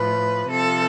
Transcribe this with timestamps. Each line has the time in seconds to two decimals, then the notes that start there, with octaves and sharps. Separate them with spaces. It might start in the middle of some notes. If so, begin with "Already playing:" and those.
Already playing: A2 F3 B4
0.50 C3 F3 A4